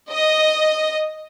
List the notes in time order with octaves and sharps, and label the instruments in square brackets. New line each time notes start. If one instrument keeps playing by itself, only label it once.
[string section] D#5